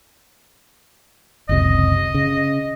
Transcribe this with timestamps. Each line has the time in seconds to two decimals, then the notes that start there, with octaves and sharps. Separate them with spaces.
1.49 F#1 C#2 C3 D#5
2.15 C#3